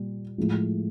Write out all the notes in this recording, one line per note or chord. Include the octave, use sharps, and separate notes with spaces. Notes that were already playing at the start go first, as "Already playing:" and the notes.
Already playing: A#2 G3
A2 F3 G#3